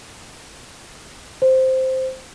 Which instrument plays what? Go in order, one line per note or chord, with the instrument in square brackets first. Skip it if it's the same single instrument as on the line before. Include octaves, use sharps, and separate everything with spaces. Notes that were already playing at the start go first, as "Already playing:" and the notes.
[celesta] C5